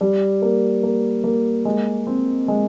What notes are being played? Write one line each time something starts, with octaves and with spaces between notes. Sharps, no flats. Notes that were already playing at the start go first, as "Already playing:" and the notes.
G3
A#3
A#3
A#3
G#3
C4
G#3